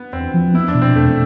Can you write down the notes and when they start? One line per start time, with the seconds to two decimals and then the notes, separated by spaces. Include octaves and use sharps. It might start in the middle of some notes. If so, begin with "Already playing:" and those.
Already playing: B3
0.13 E2 C4
0.34 F3
0.54 B3 E4
0.68 D4
0.75 B2
0.82 C4
0.95 E2 A3